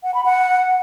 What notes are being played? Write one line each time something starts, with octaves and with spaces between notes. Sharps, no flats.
F#5
B5
F#5